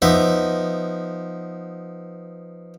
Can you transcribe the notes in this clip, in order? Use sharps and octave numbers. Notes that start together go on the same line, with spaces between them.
F3 B3 D#4 E5 D6